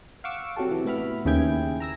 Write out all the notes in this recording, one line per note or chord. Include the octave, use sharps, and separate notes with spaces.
F5 F#5 C#6 D6 E6
C3 F#3 F#4 G4 A4
C3 E3
A2 B3 E5 B5 F6
D#2 C#3 E4 G#4 G5 G#6
A#5 E6 A#6